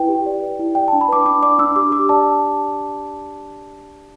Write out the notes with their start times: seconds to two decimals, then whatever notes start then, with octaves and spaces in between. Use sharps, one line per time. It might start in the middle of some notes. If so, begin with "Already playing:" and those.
Already playing: E4 B4 G5
0.08 G4
0.26 D5
0.42 B4
0.59 E4
0.75 D5 G5
0.88 A5
0.93 D4
1.01 B5
1.08 B4 D6
1.25 D4 D6
1.42 D5 D6
1.59 D4 E6
1.76 G4 D6
1.92 G4 D6
2.09 D5 A5